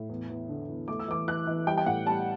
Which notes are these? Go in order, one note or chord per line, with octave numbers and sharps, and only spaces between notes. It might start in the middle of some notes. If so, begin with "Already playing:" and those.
Already playing: A2
E2
E2
D3
E2
A3 D6
E6
E3 D6
E3 F#6
E3
G3 G5
G5
A2 F#5
G3 A5